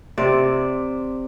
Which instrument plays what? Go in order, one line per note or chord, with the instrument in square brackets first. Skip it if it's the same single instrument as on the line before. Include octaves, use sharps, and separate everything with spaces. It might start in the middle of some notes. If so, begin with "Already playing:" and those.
[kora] C3 C4 D5